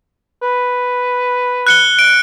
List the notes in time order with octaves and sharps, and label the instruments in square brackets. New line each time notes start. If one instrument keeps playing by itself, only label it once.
[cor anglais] B4
[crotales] F#6 C#7 G7
D7